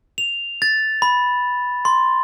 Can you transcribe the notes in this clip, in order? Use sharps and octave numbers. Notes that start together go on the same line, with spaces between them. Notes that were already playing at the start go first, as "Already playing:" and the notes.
F7
A6
B5
C6